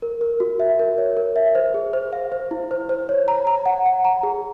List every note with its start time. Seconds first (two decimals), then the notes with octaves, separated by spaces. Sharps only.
0.02 A#4
0.21 A#4
0.40 F#4
0.60 E5
0.79 A#4
0.98 C#5
1.17 A#4
1.36 E5
1.55 C5
1.74 G#4
1.93 C5
2.13 F5
2.32 C5
2.51 E4
2.71 C5
2.89 C5
3.09 C#5
3.28 A#5
3.47 A#5
3.66 F#5
3.86 F#5
4.05 A#5
4.23 G#4